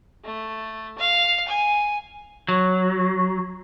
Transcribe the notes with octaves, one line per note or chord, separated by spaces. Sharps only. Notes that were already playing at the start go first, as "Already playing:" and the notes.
A3
F5
G#5
F#3